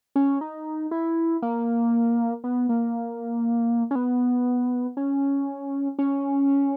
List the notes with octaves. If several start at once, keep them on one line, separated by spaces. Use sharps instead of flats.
C#4
D#4
E4
A#3
B3
A#3
C#4
B3
C#4
C#4